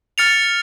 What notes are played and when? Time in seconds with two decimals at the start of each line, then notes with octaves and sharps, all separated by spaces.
0.18 F6 A6 C#7 F7